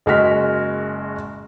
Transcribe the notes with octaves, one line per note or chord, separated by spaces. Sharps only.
F#1 G#3 F#4 F6 B6